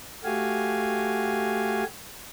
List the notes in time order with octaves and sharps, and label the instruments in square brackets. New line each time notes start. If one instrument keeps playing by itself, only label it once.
[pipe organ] A3 F#4 G4 F5 G#5